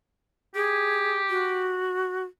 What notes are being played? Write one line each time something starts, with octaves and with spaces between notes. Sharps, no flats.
G4 G#4
F#4